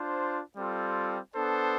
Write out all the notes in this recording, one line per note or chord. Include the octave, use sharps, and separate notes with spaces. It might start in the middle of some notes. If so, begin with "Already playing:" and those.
Already playing: D4 F4 C5
G3 C4 F4 A4
B3 D4 A4 C5